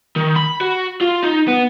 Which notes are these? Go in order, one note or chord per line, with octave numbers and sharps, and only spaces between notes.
D#3
B5
F#4
F4
D#4
B3